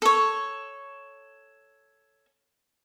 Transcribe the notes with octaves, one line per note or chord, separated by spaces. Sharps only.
A4 C#5